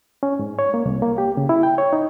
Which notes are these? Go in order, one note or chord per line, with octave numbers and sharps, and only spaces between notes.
C#4
G#2
C#5
A#3
C2
A#3
G4
C#3
E4
G5
C#5
D#4